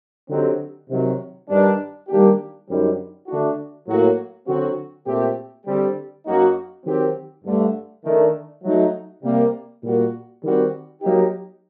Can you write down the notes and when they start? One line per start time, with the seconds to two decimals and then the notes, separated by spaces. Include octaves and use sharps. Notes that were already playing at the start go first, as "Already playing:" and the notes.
0.29 D3 F#3 C4 D#4 G4
0.89 C3 D#3 F#3
1.49 G2 D#3 G3 D4
2.08 D#3 G3 A#3 D4 G4
2.69 F#2 D3 G3 C4 D#4
3.27 D3 A3 D4 F#4
3.87 A2 F#3 A#3 F#4
4.47 D3 F#3 C4 F#4
5.06 A#2 A3 C4 G4
5.66 D3 G3 C4 G4
6.26 F#2 F#3 A#3 D#4 F#4
6.86 D#3 F#3 C4 G4
7.45 G2 D3 A3
8.04 D#3 A3 D4
8.63 F#3 A3 D#4
9.23 C3 G3 A#3
9.83 A#2 G3 A#3 F#4
10.42 D#3 G3 C4 F#4
11.02 F#3 A#3 D#4 G4